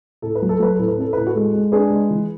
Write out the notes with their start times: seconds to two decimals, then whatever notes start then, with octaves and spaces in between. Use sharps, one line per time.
0.22 A2 A4
0.35 B4
0.42 F#3
0.49 A4
0.60 F#3 B4
0.74 A2 A4
0.88 B4
0.98 C#4 A4
1.13 A2 B4
1.27 F#4 A4
1.35 G#3
1.53 G#3
1.72 D4 G#4 B4
1.90 G#3
2.10 E3